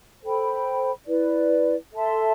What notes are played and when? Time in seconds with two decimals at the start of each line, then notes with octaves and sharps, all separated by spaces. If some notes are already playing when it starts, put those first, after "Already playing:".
0.23 A4 C5 G5 B5
1.07 E4 B4 D5
1.93 A4 E5 A5 C6